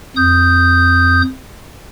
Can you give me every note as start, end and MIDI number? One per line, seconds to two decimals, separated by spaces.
0.16 1.22 41
0.16 1.22 87
0.16 1.22 91